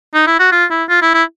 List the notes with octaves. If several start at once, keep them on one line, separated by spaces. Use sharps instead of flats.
D#4
E4
F#4
F4
E4
F4
E4
E4